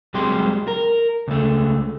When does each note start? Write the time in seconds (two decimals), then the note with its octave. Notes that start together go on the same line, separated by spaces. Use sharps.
0.14 C2 C3 F#3 G#3 G4 C6
0.68 A#4
1.28 C#2 A3